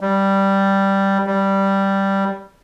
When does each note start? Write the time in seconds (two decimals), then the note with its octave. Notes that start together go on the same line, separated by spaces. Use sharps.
0.01 G3
1.27 G3